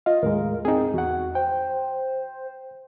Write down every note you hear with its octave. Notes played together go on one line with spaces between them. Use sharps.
F4 D#5 F5
D#2 A2 G#3 A#4
C4 D#4 G#4
E2 F#4 F#5
C5 G5